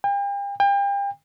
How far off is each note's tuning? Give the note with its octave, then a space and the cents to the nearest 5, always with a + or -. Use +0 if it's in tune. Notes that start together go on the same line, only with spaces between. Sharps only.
G5 +40
G5 +35